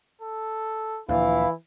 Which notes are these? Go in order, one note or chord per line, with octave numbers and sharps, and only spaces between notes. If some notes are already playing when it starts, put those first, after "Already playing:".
A4
D2 A#2 E3 F3 E4 F5